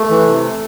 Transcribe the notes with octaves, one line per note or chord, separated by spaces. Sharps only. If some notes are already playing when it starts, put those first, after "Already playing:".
Already playing: A3
E3
C3